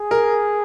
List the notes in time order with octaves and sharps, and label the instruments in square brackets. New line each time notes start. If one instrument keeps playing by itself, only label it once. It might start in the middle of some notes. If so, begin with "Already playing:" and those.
Already playing: [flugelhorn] G#4
[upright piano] A#4